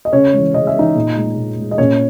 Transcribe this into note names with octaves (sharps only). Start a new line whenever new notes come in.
D#5
C#3 C#4 C#5
E3 G#3
C#3 D#5
E5
E3 G#3 D#4 D#5
A#2
G#3
A#2
G#3
D#5
A#2 C#4 C#5